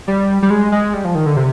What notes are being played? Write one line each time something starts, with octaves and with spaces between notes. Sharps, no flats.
G3
G3
G#3
G#3
G3
F3
D#3
D3
C3